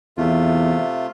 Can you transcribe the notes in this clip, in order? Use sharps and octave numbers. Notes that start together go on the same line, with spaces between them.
E2 C3 A3 F4